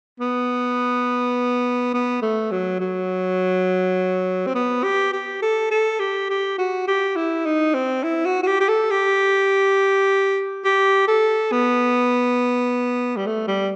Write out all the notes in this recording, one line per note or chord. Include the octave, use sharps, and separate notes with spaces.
B3
B3
A3
F#3
F#3
C4
B3
G4
G4
A4
A4
G4
G4
F#4
G4
E4
D#4
C4
E4
F#4
F#4
G4
G4
A4
G4
G4
A4
B3
G3
A3
G3